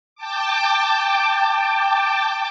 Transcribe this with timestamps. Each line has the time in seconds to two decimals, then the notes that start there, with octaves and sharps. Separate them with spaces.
0.16 G5 A5 D6